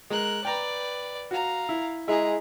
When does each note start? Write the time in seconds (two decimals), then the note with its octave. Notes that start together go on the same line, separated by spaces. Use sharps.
0.10 G#3 A#4 F#6
0.45 B4 D5 G5 A#5
1.31 F#4 F5 A#5
1.69 E4
2.08 G#3 E4 G#4 A#5